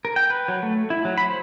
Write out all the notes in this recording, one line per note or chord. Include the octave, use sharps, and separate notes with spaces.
A#4
G5
B4
F#3
A3
E4
F#3
B5
C5